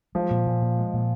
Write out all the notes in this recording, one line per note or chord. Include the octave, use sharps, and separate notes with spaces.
F3 G#3
A#2
A#2
A#2
G#3
A#2